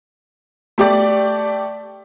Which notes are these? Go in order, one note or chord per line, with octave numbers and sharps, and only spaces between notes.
A3 G4 D5